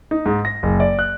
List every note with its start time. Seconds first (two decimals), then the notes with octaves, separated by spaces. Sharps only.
0.11 D#4
0.26 G#2
0.45 A#6
0.63 F#1
0.80 D5
0.99 F#6